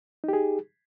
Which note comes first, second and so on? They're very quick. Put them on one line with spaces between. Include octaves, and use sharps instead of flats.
D#4 G4 G#4